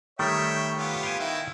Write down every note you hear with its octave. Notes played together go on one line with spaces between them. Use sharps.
D#3 G3 A3 C#5 E5 G5
B3 F4 G4
F5 G5 G#5
D#3 E4